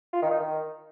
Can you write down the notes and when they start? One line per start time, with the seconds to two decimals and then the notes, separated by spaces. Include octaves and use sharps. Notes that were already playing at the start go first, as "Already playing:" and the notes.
0.13 F4
0.22 D#3
0.31 D#4
0.40 D#3